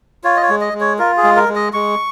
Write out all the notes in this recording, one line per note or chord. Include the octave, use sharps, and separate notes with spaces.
F4 C#5
D#5
C#5
G#3
D#5
G#3
C#5
F4 A#4
G#4
G#3
A#4
G#3
D#5
G#3 C#6